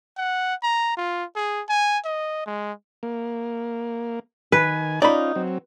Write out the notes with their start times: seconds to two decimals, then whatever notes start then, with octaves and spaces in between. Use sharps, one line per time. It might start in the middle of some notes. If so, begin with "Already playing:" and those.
0.17 F#5
0.63 A#5
0.97 F4
1.36 G#4
1.69 G#5
2.05 D#5
2.47 G#3
3.03 A#3
4.52 D#3 B4 G#5
5.02 C#4 D#4 F4 D5 B5
5.36 F#3 C4